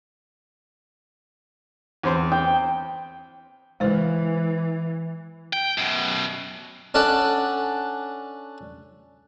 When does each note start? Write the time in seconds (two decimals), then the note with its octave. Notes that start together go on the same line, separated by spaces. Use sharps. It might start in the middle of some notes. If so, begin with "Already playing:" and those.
2.03 E2 C4 C5
2.32 G5
3.80 E3 G#3 C5
5.53 G5
5.78 F#2 B2
6.94 C#4 D4 A4 F#5